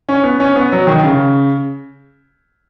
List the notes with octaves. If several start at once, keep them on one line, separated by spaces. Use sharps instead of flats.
C#4
B3
C#4
B3
F#3
D#3
C#3